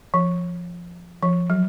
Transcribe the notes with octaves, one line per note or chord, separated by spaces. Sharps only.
F3
F3
F#3